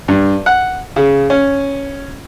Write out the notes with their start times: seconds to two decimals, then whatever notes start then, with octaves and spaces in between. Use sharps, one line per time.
0.08 G2
0.46 F#5
0.96 C#3
1.30 C#4